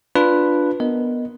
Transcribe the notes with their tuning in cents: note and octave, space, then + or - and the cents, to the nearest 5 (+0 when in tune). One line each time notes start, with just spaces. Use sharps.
D4 +0 F4 +0 B4 +0
B3 -10 A#4 +0 D#5 +0